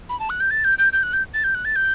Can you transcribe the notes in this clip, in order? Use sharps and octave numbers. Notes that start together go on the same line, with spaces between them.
B5
A5
F#6
G6
A6
G6
G6
G6
F#6
G6
A6
G6
F#6
A6
G6